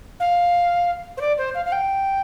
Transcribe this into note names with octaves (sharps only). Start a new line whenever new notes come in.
F5
C5
D5
C5
F5
F5
G5